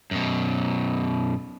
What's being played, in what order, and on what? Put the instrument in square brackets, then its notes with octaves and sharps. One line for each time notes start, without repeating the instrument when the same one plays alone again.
[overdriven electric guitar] F#2 B2